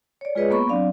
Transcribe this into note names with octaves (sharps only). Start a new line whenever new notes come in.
C#5 D5
G#3 F4 G#4 B4 C#5 D#5
A#3 B3 B5 C#6
F#3 C4 D4 D5 F5